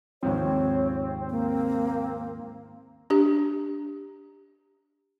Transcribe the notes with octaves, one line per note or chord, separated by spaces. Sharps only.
D#2 G#2 F3 C4 C#5
A#3
D4 G4